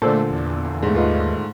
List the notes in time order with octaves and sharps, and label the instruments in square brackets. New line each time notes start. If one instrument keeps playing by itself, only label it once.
[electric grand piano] A#2 D3 [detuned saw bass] A3 [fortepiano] A4 C5 D5
[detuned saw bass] E2
[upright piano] G#2 A3
[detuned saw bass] D#2 [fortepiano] F4 B4 D#5